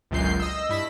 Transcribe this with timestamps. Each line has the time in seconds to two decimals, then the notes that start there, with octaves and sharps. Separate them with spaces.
0.11 G1 C#2 F#2 A#2 G6 C7
0.40 D#5 E6
0.69 G2 E4 B6 E7